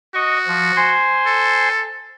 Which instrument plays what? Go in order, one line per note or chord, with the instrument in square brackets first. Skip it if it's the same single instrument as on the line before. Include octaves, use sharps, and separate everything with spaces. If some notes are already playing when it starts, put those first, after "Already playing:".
[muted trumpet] F#4 [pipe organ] D#5 C#6
[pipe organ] F3
C5 G#5 C6
[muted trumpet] A4